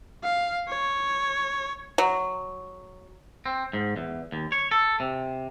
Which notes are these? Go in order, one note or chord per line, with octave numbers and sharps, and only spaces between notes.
F5
C#5
F#3
C4
G#2
E2
D#2
C#5
A4
C3